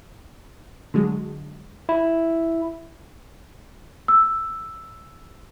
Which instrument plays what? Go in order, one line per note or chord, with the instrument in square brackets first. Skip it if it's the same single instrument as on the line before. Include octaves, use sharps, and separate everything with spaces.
[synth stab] D3 F#3 G#3
[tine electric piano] E4
[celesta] E6